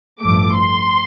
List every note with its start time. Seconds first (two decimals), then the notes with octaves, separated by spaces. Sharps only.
0.21 A1 G2 F3 A3 D6
0.56 C6